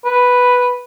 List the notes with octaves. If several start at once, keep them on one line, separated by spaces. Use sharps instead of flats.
B4